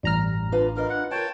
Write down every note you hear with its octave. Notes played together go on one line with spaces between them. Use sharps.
A1 G2 G3 A#5 F6
D4 F4 B4
F4 A#4 B4 D#5
F#5
F4 A#4 C#5 G5 A5